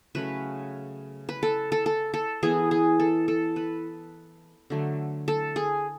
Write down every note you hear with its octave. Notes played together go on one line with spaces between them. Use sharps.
C#3 F#3 A3 C#4 B4
B4
A4
A4
A4
A4
E3 B3 E4 G#4
G#4
A4
A4
B4
D3 F#3 A3
A4
G#4